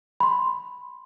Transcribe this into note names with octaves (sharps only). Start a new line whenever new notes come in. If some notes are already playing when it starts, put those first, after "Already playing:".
B5 C6